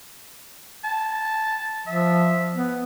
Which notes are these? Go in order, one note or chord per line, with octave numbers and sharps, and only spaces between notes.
A5
F3 E5
B3